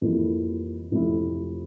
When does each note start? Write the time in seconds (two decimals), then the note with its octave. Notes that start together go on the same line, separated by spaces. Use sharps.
0.01 F2 E3 G3 A#3 E4
0.92 F2 C3 F3 A3 E4